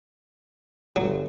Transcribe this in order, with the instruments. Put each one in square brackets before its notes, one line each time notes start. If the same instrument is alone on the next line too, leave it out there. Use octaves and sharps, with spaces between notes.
[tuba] G1 [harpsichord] F#3